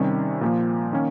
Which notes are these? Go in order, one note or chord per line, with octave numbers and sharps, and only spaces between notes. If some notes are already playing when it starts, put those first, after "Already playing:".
Already playing: C3 D#3 G3 C#4
A#2 F3 A#3
D#3 A#3 C#4